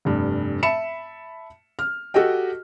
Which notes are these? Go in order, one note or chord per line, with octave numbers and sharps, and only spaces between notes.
F1 G2
E5 A5 B5 C#7 E7
F6
F#4 G4 A4 D#5 G5